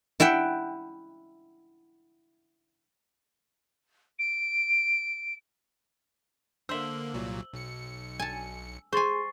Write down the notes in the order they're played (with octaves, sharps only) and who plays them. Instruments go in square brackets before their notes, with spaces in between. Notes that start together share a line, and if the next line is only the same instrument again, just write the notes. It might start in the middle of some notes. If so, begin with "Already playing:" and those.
[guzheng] E4 E5 F#5 G5
[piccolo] D7
[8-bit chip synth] D3 A#3 [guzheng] C5 E5 [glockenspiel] E6 F#7 G7
[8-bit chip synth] C2 A#2 F#3
B1 C#7
[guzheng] G#5 A5
[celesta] G#4 C6 [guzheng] C5 G#5 [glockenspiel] C#6 A6 C7